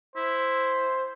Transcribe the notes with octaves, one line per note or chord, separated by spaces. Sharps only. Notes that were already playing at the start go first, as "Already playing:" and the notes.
E4 C5